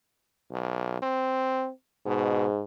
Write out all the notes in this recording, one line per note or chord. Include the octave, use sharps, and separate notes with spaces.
B1
C4
G#2 B2